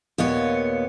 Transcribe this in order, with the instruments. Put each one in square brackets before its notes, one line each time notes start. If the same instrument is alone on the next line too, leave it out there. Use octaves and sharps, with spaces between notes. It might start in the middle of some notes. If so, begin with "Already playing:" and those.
[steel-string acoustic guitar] D#2 A#2 B3 C#5